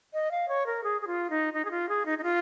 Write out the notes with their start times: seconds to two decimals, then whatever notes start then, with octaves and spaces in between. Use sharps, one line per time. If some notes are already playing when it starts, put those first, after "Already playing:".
0.13 D#5
0.31 F5
0.49 C#5
0.66 A#4
0.84 G#4
1.01 G#4
1.07 F4
1.30 D#4
1.53 D#4
1.65 G#4
1.71 F4
1.89 G#4
2.06 D#4
2.18 D#4
2.23 F4